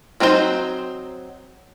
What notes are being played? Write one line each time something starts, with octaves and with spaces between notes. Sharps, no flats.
F#3 C4 D#4 F4 C5